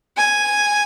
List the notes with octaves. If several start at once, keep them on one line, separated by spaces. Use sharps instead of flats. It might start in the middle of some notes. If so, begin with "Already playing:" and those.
G#5